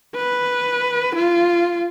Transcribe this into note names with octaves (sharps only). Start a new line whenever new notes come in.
B4
F4